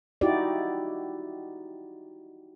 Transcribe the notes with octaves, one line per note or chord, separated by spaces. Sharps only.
D#4 E4 F#4 G4 D5